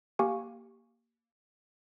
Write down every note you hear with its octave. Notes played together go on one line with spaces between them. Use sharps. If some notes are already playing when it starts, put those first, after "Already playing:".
A#3 G4 F5 G#5 C#6